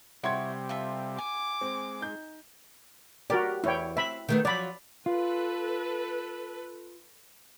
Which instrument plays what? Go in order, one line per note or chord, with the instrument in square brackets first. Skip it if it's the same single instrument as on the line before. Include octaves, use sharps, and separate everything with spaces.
[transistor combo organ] C3 G3 [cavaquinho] E4 C#5 C#6 [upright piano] F#5 C6 G#6
[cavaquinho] F4 A4 E5
[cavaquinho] G#5 [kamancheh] D6
[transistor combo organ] G#3 [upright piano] C4
[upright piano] D#4 G6
[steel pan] F#4 A#4 D5 [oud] G4
[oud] E2 [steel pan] E4 C#5 G5
[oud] C4 [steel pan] E5 B5
[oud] D#3 A3 B3
[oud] F3 F#3 [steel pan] D5 B5
[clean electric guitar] F4 [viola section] A4 B4